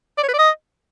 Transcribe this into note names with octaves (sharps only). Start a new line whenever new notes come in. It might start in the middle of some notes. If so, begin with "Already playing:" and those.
D5
C#5
B4
D5
D#5